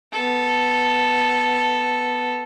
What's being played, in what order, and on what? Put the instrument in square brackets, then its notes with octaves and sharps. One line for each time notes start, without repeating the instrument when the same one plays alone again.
[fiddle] B3 A4